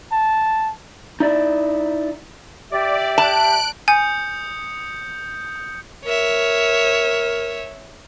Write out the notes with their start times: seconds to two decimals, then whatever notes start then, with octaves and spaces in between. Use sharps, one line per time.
0.12 A5
1.20 D#4 E4 D5
2.72 G4 D5 E5
3.18 A5 F#6 D7
3.88 G#5 D#6 G6 C#7
6.06 A#4 C#5 E5